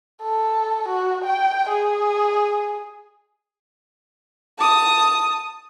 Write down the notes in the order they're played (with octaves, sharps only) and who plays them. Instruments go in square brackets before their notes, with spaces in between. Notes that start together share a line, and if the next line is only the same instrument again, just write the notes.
[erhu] A4
F#4
G5
G#4
[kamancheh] A5 D#6